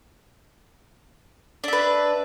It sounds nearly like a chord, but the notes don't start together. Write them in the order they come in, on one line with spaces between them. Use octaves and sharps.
D4 E5 B4